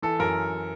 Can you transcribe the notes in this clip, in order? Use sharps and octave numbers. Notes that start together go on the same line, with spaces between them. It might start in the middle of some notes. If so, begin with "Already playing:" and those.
E3 A4
F#2 A#4